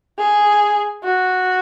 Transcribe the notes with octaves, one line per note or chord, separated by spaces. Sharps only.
G#4
F#4